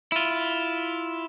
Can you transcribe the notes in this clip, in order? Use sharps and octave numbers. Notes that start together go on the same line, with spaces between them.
E4 F4